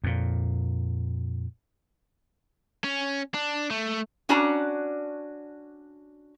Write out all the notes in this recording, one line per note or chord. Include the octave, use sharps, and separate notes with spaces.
F2 A#2
C#4
D4
A3
C#4 D4 F#4 D5 A5 A#5